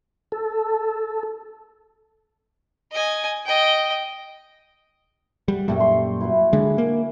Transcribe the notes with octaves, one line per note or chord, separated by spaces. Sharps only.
A4
D#5 G#5
D#5 G5
G3 F#5
F#2 A#2 G3 A3 G5
A4 C6 C#6
E4 F#4 B4
D3 G#3 G#5
A#3